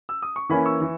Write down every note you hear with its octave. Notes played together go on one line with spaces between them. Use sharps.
E6
D#6
C#6
E3 A#3 C#4 G#5 B5
C#6 E6
E3